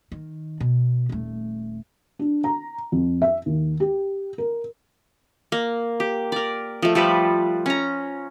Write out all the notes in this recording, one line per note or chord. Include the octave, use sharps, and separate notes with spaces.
D#3
B2
D#1 A3
D4
A#5
F2
E5
D#2
G4
A#4
A#3
G4
A#4 D5
F3 A3
F3 G3 A4 B4
C#4 A#5